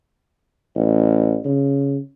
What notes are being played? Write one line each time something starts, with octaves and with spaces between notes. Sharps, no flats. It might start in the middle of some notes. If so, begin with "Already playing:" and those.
A1
C#3